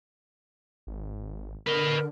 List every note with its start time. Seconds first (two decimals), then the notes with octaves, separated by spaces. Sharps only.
0.87 G#1
1.67 D3 A#4 B4 D#5